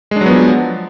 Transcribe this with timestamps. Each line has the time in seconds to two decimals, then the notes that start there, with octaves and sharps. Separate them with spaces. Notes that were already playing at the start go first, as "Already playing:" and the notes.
0.11 G#3
0.16 D4
0.21 F#3
0.26 B3
0.31 F3